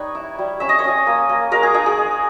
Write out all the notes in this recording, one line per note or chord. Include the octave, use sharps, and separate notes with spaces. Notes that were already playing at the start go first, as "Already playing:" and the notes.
Already playing: G3 D#4 B4 C#5
E4
G3
C#4 E5
D#5
C#5
C#4 D#5
A#3
A#3
G#3 A#4
G#4
D#4 G#4
G#4
G#3